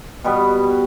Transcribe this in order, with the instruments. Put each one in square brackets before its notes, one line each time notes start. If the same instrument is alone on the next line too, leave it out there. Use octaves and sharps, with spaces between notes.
[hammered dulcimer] B2 G3 B3